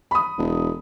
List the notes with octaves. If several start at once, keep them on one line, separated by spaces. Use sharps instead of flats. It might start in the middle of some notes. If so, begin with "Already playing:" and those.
B5 D#6
E1